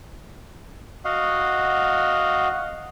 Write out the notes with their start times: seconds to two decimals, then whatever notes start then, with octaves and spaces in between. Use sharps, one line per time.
1.05 F#4 D#5 F5 F#5